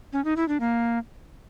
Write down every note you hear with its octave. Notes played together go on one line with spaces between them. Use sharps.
C#4
D#4
E4
D4
A#3